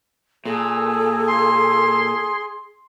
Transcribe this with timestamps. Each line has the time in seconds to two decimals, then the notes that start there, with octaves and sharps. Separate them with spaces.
0.45 A#2 G#4 A4
1.28 C6